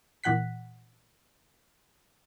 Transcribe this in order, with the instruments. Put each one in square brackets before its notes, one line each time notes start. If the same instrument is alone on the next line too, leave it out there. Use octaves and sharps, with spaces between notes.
[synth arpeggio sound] A#2 E3 F#5 F#6 B6